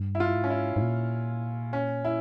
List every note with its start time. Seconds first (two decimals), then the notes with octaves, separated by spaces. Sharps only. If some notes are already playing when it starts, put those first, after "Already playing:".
Already playing: G2
0.15 E4
0.20 F4
0.35 G#2
0.44 C#4
0.50 E4
0.76 G#2
0.82 A#2
1.73 C#4
2.05 E4